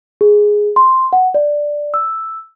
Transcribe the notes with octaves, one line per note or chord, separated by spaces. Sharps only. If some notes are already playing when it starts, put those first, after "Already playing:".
G#4
C6
F#5
D5
E6